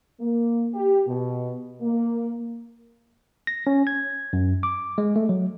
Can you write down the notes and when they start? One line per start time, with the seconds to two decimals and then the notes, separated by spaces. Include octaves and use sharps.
0.20 A#3
0.74 G4
1.07 B2
1.81 A#3
3.47 A#6
3.67 C#4
3.87 G#6
4.33 F#2
4.63 D6
4.98 G#3
5.16 A3
5.29 F#3